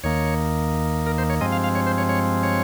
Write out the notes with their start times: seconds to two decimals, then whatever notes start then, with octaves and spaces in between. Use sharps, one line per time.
0.04 D#2 D#3 A#3 C#5
1.07 A#4
1.18 C5
1.30 C#5
1.41 G2 F3 G#3 C4 D#5
1.52 F5
1.64 F5
1.75 C#5
1.87 C5
1.98 C#5
2.09 C#5
2.43 C#5